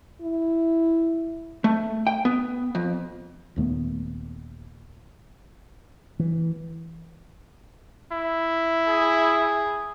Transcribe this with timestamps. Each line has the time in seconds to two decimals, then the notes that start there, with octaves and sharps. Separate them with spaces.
0.22 E4
1.64 A3
2.07 G5
2.25 B3
2.75 F2
3.56 D#1 D#2 A3 B3
6.20 E3
8.12 E4
8.88 G#4